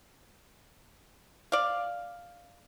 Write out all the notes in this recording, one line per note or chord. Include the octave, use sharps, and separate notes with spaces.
D5 F5